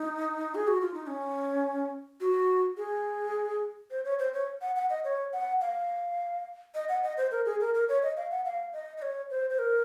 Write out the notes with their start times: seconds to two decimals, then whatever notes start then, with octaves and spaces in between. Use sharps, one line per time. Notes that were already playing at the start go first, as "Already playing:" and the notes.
Already playing: D#4
0.55 G#4
0.68 F#4
0.81 F4
0.94 D#4
1.07 C#4
2.21 F#4
2.77 G#4
3.91 C5
4.05 C#5
4.19 C5
4.34 C#5
4.61 F#5
4.76 F#5
4.90 D#5
5.04 C#5
5.33 F#5
5.61 F5
6.75 D#5
6.89 F#5
7.03 D#5
7.17 C5
7.31 A#4
7.46 G#4
7.60 A#4
7.75 A#4
7.89 C#5
8.03 D#5
8.17 F5
8.31 F#5
8.45 F5
8.73 D#5
8.97 D#5
9.02 C#5
9.30 C5
9.50 C5
9.59 A#4